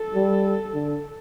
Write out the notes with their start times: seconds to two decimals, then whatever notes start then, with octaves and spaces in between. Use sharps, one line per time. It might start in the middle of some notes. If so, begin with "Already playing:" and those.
Already playing: A4
0.15 G3
0.74 D3